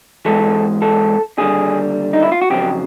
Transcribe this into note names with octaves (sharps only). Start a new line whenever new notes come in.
G#2 E3 G#3 A4
A4
D#2 D3 G3 G#4
D#4
E4
F4
F#4
F2 C#3 F#3 G4